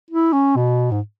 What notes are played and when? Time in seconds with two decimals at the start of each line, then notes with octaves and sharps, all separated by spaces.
0.11 E4
0.33 C#4
0.56 B2
0.91 G#2